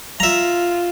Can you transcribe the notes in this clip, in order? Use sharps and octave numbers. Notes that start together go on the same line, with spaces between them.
F4 E5 A#5